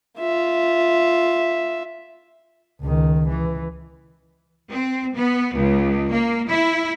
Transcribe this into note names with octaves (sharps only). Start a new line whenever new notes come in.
F4 E5
C#2 D#3
E3
C4
B3
C#2
A#3
E4